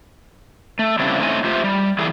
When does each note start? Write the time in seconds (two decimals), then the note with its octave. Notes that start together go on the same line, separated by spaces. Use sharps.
0.79 A3
0.99 C#3 G3 C4 D4 E4
1.19 A3 C4 C#4 D#4 E4 G#5
1.44 A3 F4 G4 C5 E5
1.64 G3
1.99 E3 G3 G#4 A4